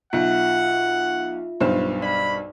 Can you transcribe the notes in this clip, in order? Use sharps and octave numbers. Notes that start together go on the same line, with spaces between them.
B1 F4 E5 F#5
B1 G2 C5
D5 B5